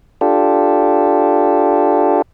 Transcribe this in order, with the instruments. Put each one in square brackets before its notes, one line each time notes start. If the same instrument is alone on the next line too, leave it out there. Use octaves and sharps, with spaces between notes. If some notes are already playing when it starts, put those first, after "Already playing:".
[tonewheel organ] D4 F4 G4 A4